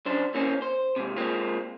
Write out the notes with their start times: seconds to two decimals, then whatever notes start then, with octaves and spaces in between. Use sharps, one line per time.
0.06 F#2 D4 C5
0.34 E3 A#3 C4 C#4
0.62 C5
0.96 G#2 C3
1.17 G#3 A#3 C4 F4